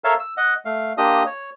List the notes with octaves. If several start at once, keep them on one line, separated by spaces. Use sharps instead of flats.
A4 A#4 C#5 E5 F5 A5
E6
D#5 F#5
A3 F5
A#3 D4 F4 G4 D#5 D#6
C#5